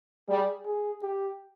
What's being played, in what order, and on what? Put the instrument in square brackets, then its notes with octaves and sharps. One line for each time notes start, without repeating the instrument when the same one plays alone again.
[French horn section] G3 [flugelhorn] G#4
[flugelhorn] G#4
G4